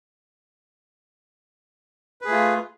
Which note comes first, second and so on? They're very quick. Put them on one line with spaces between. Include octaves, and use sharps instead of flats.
B4 G#4 A3 F4